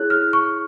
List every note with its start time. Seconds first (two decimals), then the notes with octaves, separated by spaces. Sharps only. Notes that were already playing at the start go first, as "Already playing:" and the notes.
Already playing: E4 G#4 C#5 F#6
0.10 F6
0.33 C#6